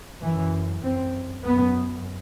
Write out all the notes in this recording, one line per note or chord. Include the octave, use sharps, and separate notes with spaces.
F#2 E3
F#2 C4
F#2 B3